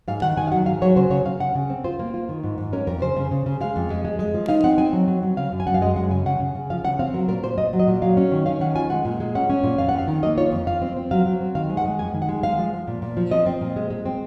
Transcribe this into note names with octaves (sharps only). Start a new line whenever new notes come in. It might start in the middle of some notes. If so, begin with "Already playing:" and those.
G#2 F5
D#3 F#5
D#3 G#5
F5
F#3 F#5
G#2 F5
F#3 C#5
C#3 C5
C#3 C#5
C#3 F5
C#3 F#5
C#3
C4
F4 C5
A#3
F4
D#3
G#2
G#2
C#4 A#4
F2 A#4
C#3 C5
C#3
C#3
C#3
G#3 F5
F2
G#3
G#3
G#3
F3
D#4 F5
C4 F#5
C4 G#5
F#3
F#3
F#3
C#3 F5
F#2
G#5
F#2 F#5
F5
G#3 D#5
F#2 F#5
C#3 G#5
C#3 F#5
C#3
C#3
F3 F5
C#3 F#5
C4 F5
F#3 A#4
A#2 A#4
A#2 C5
A#2 D#5
F#3
D#5
A#2
F#3 F5
C#4
D#3
C#4 F5
D#3 F#5
F4 G#5
G#3 F#5
A#2
G#3
C#4 F#5
C#4
A#2
F2 F5
F2 F#5
F5
D#3
A#3 D#5
F4 C#5
F2
F4 F5
C4
C4
F#3 F5
F#3
C4
D#3 F5
G#3
F#5
G#3
F2 G#5
D#3
F#5
G#3
G#3 F5
F3
F3
A#2
A#2
F3
C4 D#5
C4
A#2
G#3
G#3
C4